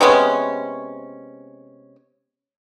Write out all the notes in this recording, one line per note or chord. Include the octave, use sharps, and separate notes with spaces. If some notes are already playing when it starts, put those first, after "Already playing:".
C3 G#3 B3 C#4